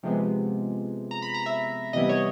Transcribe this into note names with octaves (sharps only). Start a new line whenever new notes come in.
C3 F3 G#3 B3
A#5
B5
A#5
E5
C3 E3 G3 B3 E4 D#5
C#5